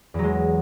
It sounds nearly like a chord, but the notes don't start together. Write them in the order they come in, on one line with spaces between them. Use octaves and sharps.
E2 F#3 G#3